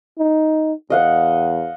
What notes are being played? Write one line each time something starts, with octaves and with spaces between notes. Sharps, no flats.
D#4
E2 D#5 F5 F#5